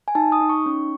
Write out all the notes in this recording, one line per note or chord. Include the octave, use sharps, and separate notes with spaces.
G#5
D#4 A5
D#6
D#4
C#6
C#4